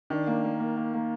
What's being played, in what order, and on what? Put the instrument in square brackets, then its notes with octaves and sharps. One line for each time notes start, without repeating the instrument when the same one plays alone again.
[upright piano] D#3 [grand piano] D4
[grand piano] A#3
A#3
A#3
A#3
A#3